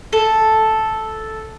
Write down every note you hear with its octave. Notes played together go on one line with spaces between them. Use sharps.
A4